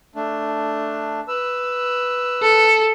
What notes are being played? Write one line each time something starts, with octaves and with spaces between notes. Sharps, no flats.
A3 D4
B4 E6
A4